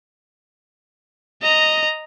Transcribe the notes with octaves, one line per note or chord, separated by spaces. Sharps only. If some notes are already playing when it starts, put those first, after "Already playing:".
D#5 A#5